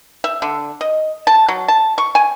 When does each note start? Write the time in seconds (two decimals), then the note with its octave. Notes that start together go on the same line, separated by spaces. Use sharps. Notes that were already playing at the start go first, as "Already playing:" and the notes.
0.24 E5
0.42 D3
0.81 D#5
1.27 A5
1.48 F#3
1.68 A5
1.98 C#6
2.15 G#5